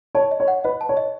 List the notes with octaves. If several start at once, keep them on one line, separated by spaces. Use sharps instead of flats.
C#5 A5
D#5
C#5
F#5
B4 D#5
A5
C#5
D#5